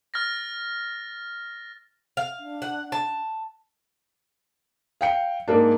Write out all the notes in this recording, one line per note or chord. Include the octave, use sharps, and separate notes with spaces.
F6 A6 A#6
F5
D4
F#5
A5
F5 G5 C#7
G#2 A#3 D4